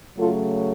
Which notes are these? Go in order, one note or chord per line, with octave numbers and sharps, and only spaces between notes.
C#3 F#3 A3 F4 A4